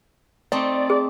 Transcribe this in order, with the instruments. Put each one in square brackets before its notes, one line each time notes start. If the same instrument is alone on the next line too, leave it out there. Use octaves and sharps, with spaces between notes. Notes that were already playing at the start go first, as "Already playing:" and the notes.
[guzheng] A3 C4 D#4 [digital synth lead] D5
[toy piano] G#4